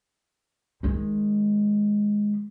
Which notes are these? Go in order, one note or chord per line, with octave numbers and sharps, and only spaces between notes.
D#3 G#3